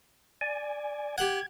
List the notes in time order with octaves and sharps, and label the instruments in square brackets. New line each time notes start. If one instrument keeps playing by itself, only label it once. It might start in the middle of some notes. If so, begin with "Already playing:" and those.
[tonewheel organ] D5 G#5
[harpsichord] G4 F#5 [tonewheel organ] G#6